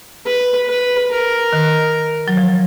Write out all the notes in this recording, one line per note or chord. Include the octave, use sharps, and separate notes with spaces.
B4
B4
A#4
D#3
F#3
F3